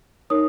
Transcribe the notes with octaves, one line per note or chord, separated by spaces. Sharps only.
D#4 A#4 C#5 D#6